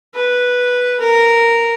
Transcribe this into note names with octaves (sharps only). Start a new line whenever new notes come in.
B4
A#4